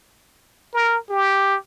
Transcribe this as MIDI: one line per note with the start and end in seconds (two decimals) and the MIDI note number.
0.73 0.98 70
1.09 1.56 67